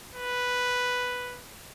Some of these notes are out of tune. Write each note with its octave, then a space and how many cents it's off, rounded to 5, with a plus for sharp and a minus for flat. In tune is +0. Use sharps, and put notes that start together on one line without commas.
B4 +0